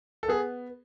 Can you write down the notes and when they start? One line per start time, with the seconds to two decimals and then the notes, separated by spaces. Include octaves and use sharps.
0.23 A4
0.28 B3 G#4